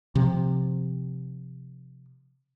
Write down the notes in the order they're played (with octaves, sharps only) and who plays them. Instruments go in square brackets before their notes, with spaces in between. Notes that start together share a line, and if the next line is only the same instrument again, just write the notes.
[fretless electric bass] C3 F3